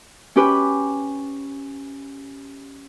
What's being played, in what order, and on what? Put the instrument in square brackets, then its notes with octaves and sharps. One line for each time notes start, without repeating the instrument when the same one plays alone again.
[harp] C#4 G4 B4